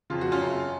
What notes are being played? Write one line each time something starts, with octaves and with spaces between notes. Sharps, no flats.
F2 C#3 F4
F#4
C#4 F4
F#2 C#3